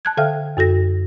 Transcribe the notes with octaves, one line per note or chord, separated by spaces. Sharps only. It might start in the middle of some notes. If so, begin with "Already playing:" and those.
A5 F#6 G#6
D3 A4 E5 F5 G5 F6
F#2 F#4 A4 A#6